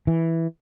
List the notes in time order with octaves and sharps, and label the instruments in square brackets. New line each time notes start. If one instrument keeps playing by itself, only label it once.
[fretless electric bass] E3